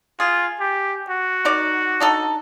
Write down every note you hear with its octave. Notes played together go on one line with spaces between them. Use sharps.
F4 G#4
G4
F#4
D#4 A#4 D5
D4 D#4 A4